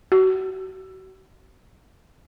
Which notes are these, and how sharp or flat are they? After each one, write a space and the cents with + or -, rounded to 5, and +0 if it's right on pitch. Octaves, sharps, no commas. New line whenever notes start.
F#4 +35